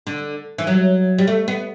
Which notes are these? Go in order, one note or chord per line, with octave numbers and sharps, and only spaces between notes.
D3
E3
F#3
G3
A3
B3